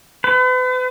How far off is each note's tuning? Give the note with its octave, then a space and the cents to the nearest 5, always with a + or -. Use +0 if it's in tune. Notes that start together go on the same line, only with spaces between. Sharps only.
B4 +40